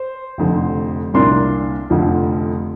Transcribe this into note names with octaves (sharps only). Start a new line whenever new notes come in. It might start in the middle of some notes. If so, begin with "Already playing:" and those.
Already playing: C5
F1 F2 D3
C2 A#2 A#3 D4 C6
F1 F2 D3 F3